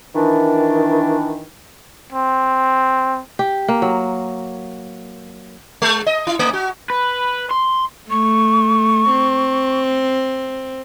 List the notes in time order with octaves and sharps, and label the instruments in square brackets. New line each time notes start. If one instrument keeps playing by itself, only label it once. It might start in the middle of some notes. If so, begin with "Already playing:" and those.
[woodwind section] D#3 E3 D4
[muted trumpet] C4
[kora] G4
A#3
F#3
[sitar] G#3
D#5
E4
A3
F#4
[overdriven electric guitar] B4
C6
[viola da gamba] A3 [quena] C#6
[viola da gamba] C4